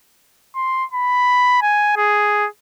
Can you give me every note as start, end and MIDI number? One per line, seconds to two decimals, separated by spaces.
0.56 0.84 84
0.93 1.57 83
1.62 1.94 80
1.97 2.48 68